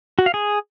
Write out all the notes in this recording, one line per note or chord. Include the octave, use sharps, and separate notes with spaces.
F#4
F5
G#4